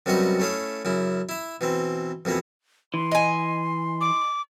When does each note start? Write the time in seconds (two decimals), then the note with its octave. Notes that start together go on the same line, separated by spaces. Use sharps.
0.06 F#2 C3 G3 B3 F#4 D#5
0.40 A3 C#4 E4 F5 D#6
0.85 F#2 C#3 E4
1.29 E4 E5
1.61 B2 E3 C4
2.25 F2 B2 E3 A#3 B3
2.94 E3 C6
3.11 D#5 G#5
4.01 D6